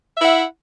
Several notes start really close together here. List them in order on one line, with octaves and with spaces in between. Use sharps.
E5 E4 F#5